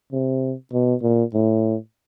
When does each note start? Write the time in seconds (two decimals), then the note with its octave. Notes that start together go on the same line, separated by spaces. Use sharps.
0.12 C3
0.73 B2
1.02 A#2
1.33 A2